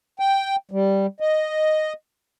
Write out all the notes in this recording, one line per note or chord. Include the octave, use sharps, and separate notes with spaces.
G5
G3
D#5